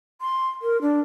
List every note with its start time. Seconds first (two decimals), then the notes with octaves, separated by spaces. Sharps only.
0.21 C6
0.62 A#4
0.81 D4